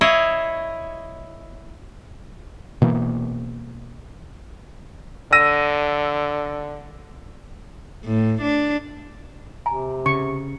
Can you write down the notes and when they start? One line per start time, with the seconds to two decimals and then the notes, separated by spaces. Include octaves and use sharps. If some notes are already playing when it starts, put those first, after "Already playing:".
0.01 E4 C#5 D#5 F5
2.82 B2 E3 A#3
5.32 D3 E6 A#6 D#7
8.05 A2
8.42 D4
9.66 C3 G#5 A#5
10.06 C#3 C#6